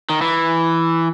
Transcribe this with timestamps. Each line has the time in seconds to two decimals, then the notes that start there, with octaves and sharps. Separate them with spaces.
0.10 D#3
0.21 E3